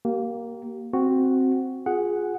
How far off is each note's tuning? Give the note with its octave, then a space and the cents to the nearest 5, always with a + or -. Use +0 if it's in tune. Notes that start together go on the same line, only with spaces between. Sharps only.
A#3 +0 G4 -30
C4 +0 F#4 +0
F4 +20 G#4 +0 F#5 +0